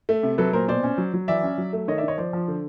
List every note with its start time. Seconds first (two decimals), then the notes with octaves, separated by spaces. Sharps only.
0.09 A3
0.23 C3
0.38 F#3 A4 B4
0.53 A#2 A#4 C5
0.68 B2 C5 D5
0.83 C#4
0.98 F#3
1.14 F#3
1.28 E3 D5 E5
1.43 C#4
1.58 F#3
1.73 A3
1.88 D#3 C#5 D#5
1.98 D5 E5
2.03 D#3 C#5 D#5
2.18 F3 C5 D5
2.33 F3
2.48 D3